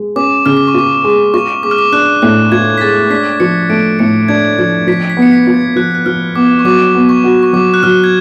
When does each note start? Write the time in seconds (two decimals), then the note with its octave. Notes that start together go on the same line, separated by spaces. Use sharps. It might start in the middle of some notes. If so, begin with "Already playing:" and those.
Already playing: G#3
0.16 C#4 D6
0.46 C#3 F6
0.57 D6
0.68 C#6
0.74 F4 D6
1.04 G#3
1.34 F4 C#6
1.63 G#3 D6
1.71 F6
1.78 D6
1.92 D4 F#6
2.22 A2 F#6
2.52 F4 G#6
2.78 B6
2.81 G#3 A6
3.10 D4 B6
3.40 F3 C#7
3.69 A3 D7
3.99 A2 C#7
4.29 D4 G#6
4.59 F3 G#6
4.87 F3 B6
5.10 B6
5.17 B3
5.22 C#7
5.32 B6
5.47 F4
5.54 G#6
5.76 F3 F#6
5.95 F#6
6.06 F3 F6
6.35 B3 D6
6.59 C#6
6.65 F#3 D6
6.95 B3
7.09 C#6
7.24 F#4
7.43 C#6
7.53 F#3 D6
7.74 F#6
7.83 F#3 F6
8.04 G#6